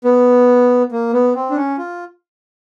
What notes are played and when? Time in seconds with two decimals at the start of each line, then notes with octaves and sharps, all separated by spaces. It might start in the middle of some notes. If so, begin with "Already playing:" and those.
0.04 B3
0.92 A#3
1.13 B3
1.35 C4
1.50 D4
1.57 C#4
1.78 F4